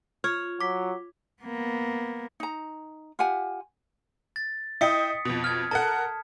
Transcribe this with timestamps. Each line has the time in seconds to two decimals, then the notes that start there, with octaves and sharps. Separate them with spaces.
0.24 F4 C#5 F6
0.60 F#3 D6 B6
1.42 A#3 B3
2.40 D#4 A#5
3.19 F4 G4 F#5 G#5
4.36 A6
4.81 E4 D#5 G5 D#6 B6 C#7
5.25 F2 B2
5.44 F6 G#6
5.71 A4 A#4 F#5 A5